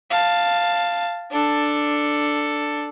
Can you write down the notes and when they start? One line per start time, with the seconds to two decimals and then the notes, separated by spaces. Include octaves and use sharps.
0.10 F5 A5
1.31 D4 A4